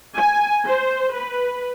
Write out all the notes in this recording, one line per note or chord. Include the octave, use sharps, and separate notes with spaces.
G#5
C5
B4